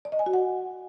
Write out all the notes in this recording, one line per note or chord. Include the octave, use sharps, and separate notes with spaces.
D5
D#5
G#5
F#4
F#5